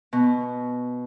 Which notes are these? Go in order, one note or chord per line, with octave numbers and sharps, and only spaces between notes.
B2